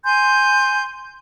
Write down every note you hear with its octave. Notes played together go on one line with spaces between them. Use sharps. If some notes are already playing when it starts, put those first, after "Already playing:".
G#5 C6 G6